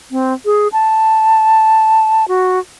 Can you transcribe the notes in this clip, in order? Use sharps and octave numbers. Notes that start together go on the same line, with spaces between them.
C4
G#4
A5
F#4